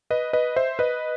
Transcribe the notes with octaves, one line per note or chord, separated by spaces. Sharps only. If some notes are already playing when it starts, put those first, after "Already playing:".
B4 D#5
B4 D#5
C5 E5
B4 D#5